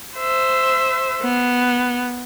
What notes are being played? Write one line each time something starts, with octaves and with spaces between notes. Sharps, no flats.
C5 E5
B3